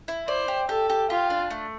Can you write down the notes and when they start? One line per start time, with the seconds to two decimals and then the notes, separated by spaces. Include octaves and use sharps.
0.08 E4
0.28 C5 D5
0.48 G4
0.69 G4 A4
0.90 G4
1.10 F4 G4
1.30 D4
1.50 A3